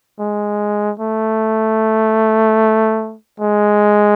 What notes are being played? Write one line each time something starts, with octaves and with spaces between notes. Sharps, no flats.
G#3
A3
G#3